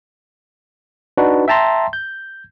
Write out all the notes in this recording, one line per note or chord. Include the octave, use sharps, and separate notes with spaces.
D4 D#4 F#4 B4
E5 G5 A5 A#5 C6
G6